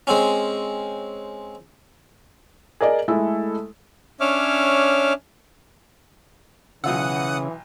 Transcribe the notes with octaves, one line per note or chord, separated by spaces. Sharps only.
G#3 C4 C#4
G#4 A#4 D5 D#5
G#3 A3 E4 A4
C#4 D4 C#5 E5 D6 F6
B1 C#3 E3 F4 F#5 D#6 E6